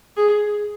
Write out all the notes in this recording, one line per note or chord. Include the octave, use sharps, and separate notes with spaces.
G#4